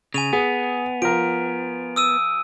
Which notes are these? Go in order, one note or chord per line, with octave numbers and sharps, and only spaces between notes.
C#3 G#5 D#7 F7
B3 G#4
F3 A#4 D7
D#6 E6 D#7